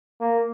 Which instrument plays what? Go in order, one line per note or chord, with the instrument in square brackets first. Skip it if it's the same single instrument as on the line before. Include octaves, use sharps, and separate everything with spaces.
[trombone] A#3